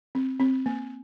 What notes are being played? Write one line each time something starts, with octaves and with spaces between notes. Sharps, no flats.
C4
C4
A#3